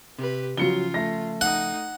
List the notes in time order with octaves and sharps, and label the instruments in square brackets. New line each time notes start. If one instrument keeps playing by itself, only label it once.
[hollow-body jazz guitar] C3 [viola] G4 B4
[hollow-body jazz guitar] C#3 F3 [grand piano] F#3 C#7 G7 [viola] F4
[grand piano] A3 A#6
[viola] D#4 [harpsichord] F#5